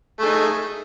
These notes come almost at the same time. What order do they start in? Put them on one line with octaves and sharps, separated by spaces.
A3 G#4 D#4